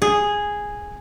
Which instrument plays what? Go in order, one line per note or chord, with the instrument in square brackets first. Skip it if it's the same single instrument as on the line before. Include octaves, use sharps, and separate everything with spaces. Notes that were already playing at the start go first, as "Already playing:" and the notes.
[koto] G#4